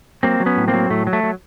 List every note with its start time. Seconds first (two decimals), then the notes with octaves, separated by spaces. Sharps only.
0.23 F#3 A#3 C4
0.40 F#3
0.46 B3 C#4
0.57 A2
0.68 A#3 C4
0.74 F#3
0.90 A2 A3
1.07 F#3
1.13 A3
1.23 F#3